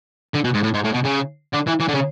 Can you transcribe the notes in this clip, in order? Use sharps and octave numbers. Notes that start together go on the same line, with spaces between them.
D3
B2
G#2
A2
G#2
A2
B2
C#3
D3
E3
E3
D3
C#3